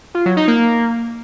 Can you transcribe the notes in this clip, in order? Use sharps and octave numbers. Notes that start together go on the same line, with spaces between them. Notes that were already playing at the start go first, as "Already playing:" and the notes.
F4
F#3
D#4
A#3